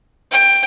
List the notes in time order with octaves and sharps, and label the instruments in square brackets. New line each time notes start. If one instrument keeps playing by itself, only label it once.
[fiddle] G5